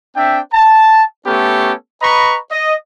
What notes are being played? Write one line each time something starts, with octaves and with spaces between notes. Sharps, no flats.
C4 D4 E5 G5
A5
A3 B3 C#4 G4 A4
B4 D#5 A#5 B5 C#6
D#5